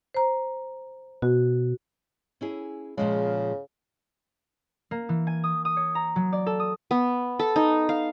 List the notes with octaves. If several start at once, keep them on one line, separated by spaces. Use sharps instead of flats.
C5 A#5
B2 F#4
C#4 E4 G#4
A#2 C#3 F3 G#3
A#3
E3
G#5
D#6
D#6
C#5
A#5
F#3
D5
A4
D#6
B3
A4
D#4
F5